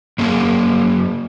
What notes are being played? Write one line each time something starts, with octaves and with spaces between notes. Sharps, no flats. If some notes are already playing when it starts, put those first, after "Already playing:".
F#2 A#3 G#4